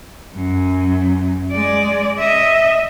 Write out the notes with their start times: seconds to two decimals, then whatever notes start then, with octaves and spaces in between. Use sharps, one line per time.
0.35 F#2
1.52 G#3 D5
2.20 D#5 E5